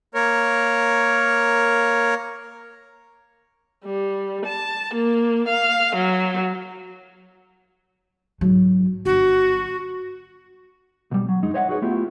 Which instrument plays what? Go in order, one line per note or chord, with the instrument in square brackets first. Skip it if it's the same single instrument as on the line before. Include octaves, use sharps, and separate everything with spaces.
[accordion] A#3 A#4 C#5
[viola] G3
A5
A#3
F5
F#3
[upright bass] G#2 F#3
[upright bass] G1 [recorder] F#4
[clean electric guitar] B1 G3
F#3
F#2 G#3 D#4
C5 C#5 D#5 E5 F#5
D#4 F#4 G#4 B4 C#5
A3 B3 E4 F4 G4